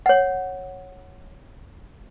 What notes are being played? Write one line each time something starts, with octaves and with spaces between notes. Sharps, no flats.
C#5 F#5